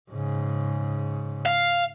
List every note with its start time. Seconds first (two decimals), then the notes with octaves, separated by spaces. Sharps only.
0.11 G#2 C#3
1.46 F5